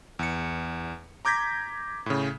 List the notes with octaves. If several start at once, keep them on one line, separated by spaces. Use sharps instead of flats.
E2 C#7
A#5 D6 G6 G#6 A#6 B6
A2 C#3